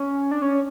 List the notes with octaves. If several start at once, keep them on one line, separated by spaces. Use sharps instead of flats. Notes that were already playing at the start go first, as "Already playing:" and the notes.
Already playing: C#4
D4
C#4